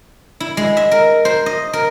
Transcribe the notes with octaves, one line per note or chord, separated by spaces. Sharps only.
E4
G#3
E5
A#4
C5
D#5
A#4